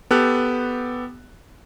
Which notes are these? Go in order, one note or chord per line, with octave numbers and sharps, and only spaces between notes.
B3 G4 A4 F#6